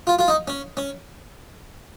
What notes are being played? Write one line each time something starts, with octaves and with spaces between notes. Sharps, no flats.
F4
F4
D#4
C#4
C#4